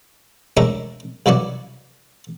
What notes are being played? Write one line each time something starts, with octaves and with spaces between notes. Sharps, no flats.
G#3 A3 C#4 D4 A4 A#4
C2 E3 F#3 F#4 D5